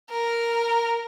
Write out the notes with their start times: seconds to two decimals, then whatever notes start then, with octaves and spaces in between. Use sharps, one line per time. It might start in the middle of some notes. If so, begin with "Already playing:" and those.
0.11 A#4